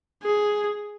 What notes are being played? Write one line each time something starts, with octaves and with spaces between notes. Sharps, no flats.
G#4